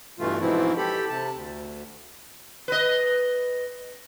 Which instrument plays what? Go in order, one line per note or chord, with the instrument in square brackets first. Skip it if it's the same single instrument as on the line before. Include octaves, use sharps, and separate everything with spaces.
[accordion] G2 B2 E3 A3 F4
G#2 B2 E3 F3 C4 E4
G4 A4 B5
C3 A5
D2
[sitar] B4 D#5